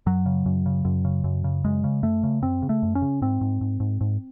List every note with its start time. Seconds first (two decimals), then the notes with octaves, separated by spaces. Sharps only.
0.06 F#2 F#3
0.26 C#3
0.46 F#2
0.66 C#3
0.85 F#2
1.05 C#3
1.24 F#2
1.44 C#3
1.64 F#2 G#3
1.84 C#3
2.03 F#2 A3
2.23 C#3
2.42 F#2 C4
2.62 C#3
2.69 A3
2.83 F#2
2.95 C#4
3.02 C#3
3.22 G#2 C4
3.41 G#2
3.61 G#2
3.80 G#2
4.01 G#2